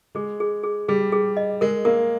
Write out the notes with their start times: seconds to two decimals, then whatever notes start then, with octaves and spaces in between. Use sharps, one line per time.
0.15 G#3 G#4
0.40 G#4
0.64 G#4
0.89 G3 G#4
1.12 G#4
1.37 D#5
1.61 G#3 A#4
1.85 A#3 A#4